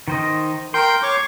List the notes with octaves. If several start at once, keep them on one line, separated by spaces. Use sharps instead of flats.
D#3 C5 D#5
A#4 G5 C6 G6
C#5 C#6 D6